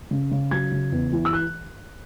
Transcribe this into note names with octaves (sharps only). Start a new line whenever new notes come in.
C#3
C#3
F#3 G#6
C#3
E2
E3
E6
F#6